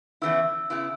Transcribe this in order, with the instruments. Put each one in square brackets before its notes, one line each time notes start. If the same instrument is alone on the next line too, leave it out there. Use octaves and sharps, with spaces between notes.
[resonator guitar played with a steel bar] E2 C#3 E3 B3 E4 [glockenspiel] E6
[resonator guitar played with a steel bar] C#3 B3 E4